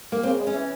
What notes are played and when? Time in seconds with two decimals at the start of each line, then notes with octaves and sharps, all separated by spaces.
0.12 A#3
0.23 C#3 C4
0.39 G#3
0.47 C#4
0.54 E3